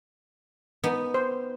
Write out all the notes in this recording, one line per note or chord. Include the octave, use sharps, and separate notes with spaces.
B3 D#4
C5